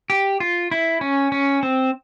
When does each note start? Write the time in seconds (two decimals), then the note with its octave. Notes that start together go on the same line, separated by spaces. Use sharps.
0.10 G4
0.40 F4
0.71 E4
1.01 C#4
1.32 C#4
1.63 C4